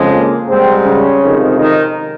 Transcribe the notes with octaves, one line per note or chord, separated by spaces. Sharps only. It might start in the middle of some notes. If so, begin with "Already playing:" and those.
Already playing: F2 C#3 F3 G#3
A#3
G#2 G3 C4
C#3 C#4
F2 C3 D#3 G#3
D#3 D#4